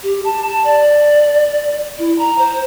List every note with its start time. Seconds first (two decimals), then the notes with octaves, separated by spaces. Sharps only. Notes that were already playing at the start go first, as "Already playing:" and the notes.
0.03 G4
0.24 A5
0.48 A5
0.64 D5
1.99 E4
2.18 A#5
2.38 C5